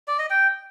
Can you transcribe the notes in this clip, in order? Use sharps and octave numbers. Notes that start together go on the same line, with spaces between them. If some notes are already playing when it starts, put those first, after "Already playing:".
D5
D#5
G5